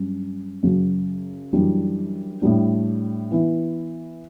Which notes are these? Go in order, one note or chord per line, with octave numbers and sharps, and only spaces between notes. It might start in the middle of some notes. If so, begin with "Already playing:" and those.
Already playing: G2 F#3 C#4
F#2 C#3 F#3
F#2 E3 G3 D4
A2 G3 D4
E3 B3 E4